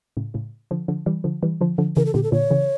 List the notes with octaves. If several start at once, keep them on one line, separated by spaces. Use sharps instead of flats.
A2 C#3
A2 C#3
D3 F3
D3 F3
E3 G3
D3 F3
E3 G3
D3 F3
D3 F3
C#3 E3 A#4
A4
A#2 D3 G4
A4
A#2 D3 C#5
C#3 E3